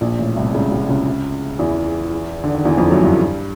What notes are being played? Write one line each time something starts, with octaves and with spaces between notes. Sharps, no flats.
A#1 A#2
A1 A2
C2 C3
C#2 C#3
C2 C3
C#2 C#3
E2 E3
D3
D#3
E2 E3
F2 F3
F#2 F#3
G2 G3